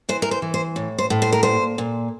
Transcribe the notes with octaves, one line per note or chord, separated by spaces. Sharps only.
E3 C5
A#4
C5
E3
C5
A2
C5
A2
C5
A#4
A#2 C5
A#2